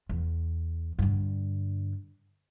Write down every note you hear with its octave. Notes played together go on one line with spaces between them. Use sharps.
E2
G2 D3